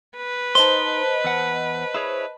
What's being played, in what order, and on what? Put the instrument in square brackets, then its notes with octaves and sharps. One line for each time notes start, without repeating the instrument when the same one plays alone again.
[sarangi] B4
[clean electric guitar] D#4 C6 [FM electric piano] C5 D#5 A5 [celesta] G7
[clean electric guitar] E2 F#5
E4 G#4 C#5